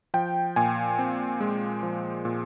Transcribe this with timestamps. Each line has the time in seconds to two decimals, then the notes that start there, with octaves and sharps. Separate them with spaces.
0.14 F3 G5
0.56 A#2 G#5
0.99 C4
1.41 G#3
1.83 F3
2.25 A#2